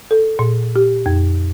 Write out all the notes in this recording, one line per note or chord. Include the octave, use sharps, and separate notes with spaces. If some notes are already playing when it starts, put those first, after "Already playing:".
A4
A#2
G4
F2